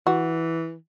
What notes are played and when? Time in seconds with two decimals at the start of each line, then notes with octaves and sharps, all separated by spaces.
0.07 E3 F#4